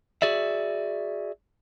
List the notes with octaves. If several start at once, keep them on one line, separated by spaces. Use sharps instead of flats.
F#4 G#4 D5 E5